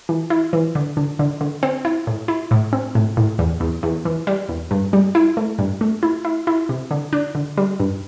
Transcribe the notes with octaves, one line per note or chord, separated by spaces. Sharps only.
E3
E4
E3
D3
D3
D3
D3
C4
E4
A2
E4
A2
C4
A2
A2
E2
E2
E2
E3
G3
E2
G2
G3
E4
A3
G2
A3
E4
E4
E4
C3
D3
D4
D3
G3
G2